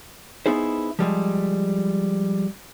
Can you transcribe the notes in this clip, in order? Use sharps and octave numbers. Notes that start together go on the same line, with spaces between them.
B3 D#4 E4 G#4 C5
F3 G3 G#3